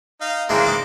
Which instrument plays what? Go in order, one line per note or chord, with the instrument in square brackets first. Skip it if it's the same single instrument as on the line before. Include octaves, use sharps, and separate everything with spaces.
[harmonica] D#4 F5
[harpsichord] C#3 E3 G#3 [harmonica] A#3 C4 D4
[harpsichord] D#4 D6